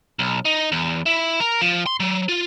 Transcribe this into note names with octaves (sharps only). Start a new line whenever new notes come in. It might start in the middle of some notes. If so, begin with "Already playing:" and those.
B1
D#4
E2
E4
A#4
F3
C6
F#3
F4